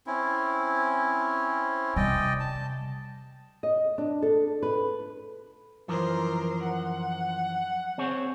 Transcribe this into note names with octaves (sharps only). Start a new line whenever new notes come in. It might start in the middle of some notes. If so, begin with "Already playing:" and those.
C4 C#4 E4
C3 G3 D5 D#5 G5
A5
D#5
D4
A4
B4
F#2 E3 F3 A#4 C5
F#5
C4 G#4 C#5